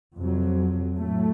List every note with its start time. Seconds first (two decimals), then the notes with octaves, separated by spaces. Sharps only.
0.16 F2 C3 F#3
0.97 A2 F#3 A3